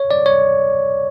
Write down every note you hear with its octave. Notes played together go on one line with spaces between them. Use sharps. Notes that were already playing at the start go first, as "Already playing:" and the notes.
Already playing: C#5
D5
C#5